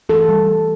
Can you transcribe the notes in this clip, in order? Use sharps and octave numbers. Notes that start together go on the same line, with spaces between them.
E3 A4
G3
G3